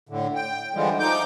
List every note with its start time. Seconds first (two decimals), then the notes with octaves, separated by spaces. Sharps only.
0.09 A2 D3
0.35 G5
0.74 D3 E3 F3 G3 G#3
1.00 F3 D#4 D6 G6